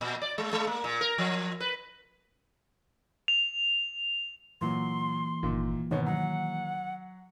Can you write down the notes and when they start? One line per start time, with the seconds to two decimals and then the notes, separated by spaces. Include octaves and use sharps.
0.01 A#2
0.22 D5
0.38 G#3
0.53 G#3
0.67 A#3
0.84 A#2
1.01 A#4
1.18 F3
1.60 B4
3.28 F7
4.61 A#2 E3 F#3 A#3 C6
5.43 G1 A#2 D#3
5.91 G#2 B2 D#3 C#5
6.06 F#3 F#5